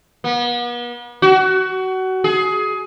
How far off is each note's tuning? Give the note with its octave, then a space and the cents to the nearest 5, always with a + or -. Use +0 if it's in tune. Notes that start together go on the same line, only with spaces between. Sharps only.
B3 -40
F#4 +25
G#4 +20